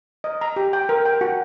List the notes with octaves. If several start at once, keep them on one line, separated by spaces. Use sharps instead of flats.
D#5
A#5
G4
G5
A#4
G5
F#4